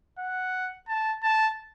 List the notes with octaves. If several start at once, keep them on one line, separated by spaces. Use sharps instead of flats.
F#5
A5
A5